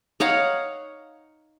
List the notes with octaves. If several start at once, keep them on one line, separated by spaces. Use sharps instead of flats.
D#4 C#5 F5 F#5